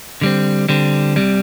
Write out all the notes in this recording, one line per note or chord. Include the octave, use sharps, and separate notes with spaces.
D3 G3 C4
D3 G3 C4
C2 C3 G3